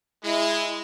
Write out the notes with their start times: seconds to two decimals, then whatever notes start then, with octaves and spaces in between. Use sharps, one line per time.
0.24 G#3 E4